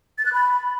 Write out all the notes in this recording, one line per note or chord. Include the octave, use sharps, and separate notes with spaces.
A6
F#6
B5